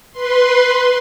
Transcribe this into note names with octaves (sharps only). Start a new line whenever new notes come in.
B4 C6